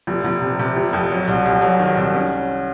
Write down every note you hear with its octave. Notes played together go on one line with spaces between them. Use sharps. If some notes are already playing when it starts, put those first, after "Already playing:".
F1
F1
C3
C3
F1
F2
F#3
C2
C2
F#3
D#3
C2
C#4